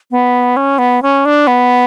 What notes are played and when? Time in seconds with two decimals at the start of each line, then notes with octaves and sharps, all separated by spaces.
0.11 B3
0.57 C#4
0.78 B3
1.02 C#4
1.25 D4
1.47 B3